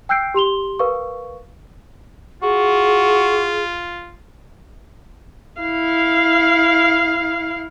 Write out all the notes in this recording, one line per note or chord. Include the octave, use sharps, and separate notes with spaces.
G5 E6 F#6 G6 C7 D7
G4 C6 F7 G7
A#4 B4 F5 C#6
F4 F#4 G#4
E4 F5